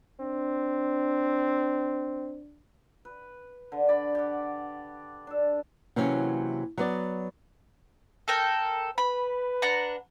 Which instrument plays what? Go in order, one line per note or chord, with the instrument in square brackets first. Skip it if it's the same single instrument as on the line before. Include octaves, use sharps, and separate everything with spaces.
[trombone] C4 [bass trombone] D4
[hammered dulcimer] B4
D3
D5 B5
G4 F#5
D4 A4
[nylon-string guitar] C3 E3 F#3 A#3 C#4
F#3 B3 D5
[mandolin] A4 A#4 G5
[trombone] B4 [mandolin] B5
[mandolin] D4 F#5 A#5